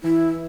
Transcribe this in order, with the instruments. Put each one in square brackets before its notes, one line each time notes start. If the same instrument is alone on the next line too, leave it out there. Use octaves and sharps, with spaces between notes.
[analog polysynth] E3 [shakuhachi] E4